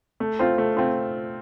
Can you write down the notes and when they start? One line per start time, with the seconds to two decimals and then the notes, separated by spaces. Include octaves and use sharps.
0.20 A3
0.39 C4 F4
0.58 A3
0.77 C4 F4